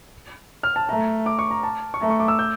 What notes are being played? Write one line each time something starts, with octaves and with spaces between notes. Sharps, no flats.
F6
A5
A3 A#5
D6
C#6
A#5
A5
C#6
A3 A#5
C#6
D6
E6
G6